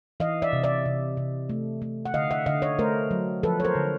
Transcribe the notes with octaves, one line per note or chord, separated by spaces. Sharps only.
E3 D#5 F5
D5 E5
C3
D5 E5
C3
C3
A3
A3
F#5
D3 D#5 F5
E5 F#5
D3 D#5 F5
C#5 D#5
A3 A#4 C5
F#3
F3 A4 B4
C#5
A#4 C5
D3